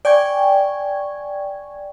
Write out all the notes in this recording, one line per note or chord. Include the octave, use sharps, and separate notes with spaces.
D5 G5 G#5 C#6 G#6